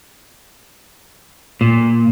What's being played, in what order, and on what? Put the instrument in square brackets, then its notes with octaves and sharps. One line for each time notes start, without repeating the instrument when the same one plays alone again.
[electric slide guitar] A#2